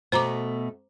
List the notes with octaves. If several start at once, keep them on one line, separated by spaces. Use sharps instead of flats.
B2 A3 C5 A#5 D6